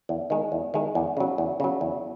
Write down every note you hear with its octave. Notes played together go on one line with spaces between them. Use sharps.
E2
D#3 G#3
E2
D#3 G#3
E2
C#3 F#3
E2
C#3 F#3
E2